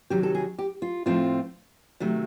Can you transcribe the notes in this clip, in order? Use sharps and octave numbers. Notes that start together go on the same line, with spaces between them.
C3 D#3 F#3 G4
A4
G#4
G4
F4
A2 F3 A3 C4 F4
C3 D#3 F#3 A3